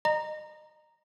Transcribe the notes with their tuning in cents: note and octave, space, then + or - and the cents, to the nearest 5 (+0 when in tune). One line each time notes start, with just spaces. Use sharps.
D#5 -30 A#5 +0